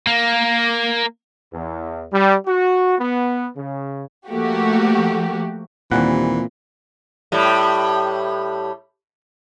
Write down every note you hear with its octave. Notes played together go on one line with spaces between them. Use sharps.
A#3
E2
G3
F#4
B3
C#3
F3 A3 A#3 F#4 G4
D#2 A#2 E3 G3 C4 F#5
A2 G3